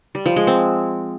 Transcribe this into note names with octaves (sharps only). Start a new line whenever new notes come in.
G3
F3
G#3
C4